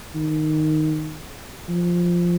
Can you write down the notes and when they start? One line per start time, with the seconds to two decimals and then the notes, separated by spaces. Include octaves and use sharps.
0.15 D#3
1.69 F3